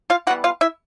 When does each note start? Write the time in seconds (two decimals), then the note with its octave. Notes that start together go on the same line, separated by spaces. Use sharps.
0.10 F4 F5
0.27 E3 G3 B3 F#4 F#5
0.44 F4 F5
0.61 E4 E5